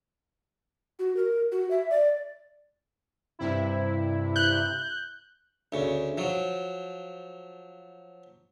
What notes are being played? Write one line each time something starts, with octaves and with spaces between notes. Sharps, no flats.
F#4
A#4
F#4
E5
D5
G2 C3 E4
F#6 G6
D2 C#3
F3 F#3